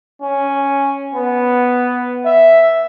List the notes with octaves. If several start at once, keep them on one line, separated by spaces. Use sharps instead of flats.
C#4
B3
E5